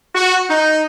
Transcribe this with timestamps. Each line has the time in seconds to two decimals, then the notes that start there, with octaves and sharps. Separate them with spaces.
0.15 F#4
0.50 D#4